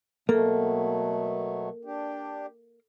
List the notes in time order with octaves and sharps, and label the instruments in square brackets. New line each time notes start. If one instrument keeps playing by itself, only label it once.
[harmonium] B2 F#3 A3 [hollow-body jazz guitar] A#3 [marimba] A4
[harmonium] D4 G4